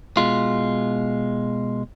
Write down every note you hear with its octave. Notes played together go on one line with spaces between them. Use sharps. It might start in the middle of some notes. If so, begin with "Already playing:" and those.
B2 G#3 F4